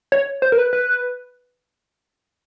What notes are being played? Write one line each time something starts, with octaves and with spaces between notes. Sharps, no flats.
C#5
C5
A#4
B4
B4